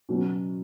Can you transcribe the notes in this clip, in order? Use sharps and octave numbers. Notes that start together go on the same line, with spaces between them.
B2 F#3 C#4